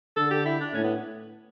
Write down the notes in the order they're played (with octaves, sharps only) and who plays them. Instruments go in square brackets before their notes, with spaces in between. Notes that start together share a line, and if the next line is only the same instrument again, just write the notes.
[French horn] D3 [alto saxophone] A4
[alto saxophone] G4
E4
D4
[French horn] A2 [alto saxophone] C#4
[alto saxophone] B3